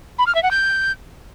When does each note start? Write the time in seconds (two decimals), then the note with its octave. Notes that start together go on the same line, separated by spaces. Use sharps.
0.19 B5
0.27 F6
0.35 E5
0.43 F#5
0.51 G6